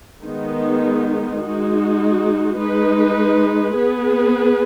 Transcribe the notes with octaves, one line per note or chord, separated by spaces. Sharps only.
D#3 G#3 B3 D#4
G#3 D#4 F#4
G#3 D#4 B4
B3 G#4 B4